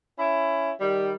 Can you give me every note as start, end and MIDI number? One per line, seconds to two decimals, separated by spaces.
0.19 0.71 61
0.19 0.71 64
0.80 1.12 51
0.80 1.12 55